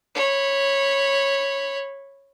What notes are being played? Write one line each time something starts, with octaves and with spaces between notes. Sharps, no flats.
C#5 B5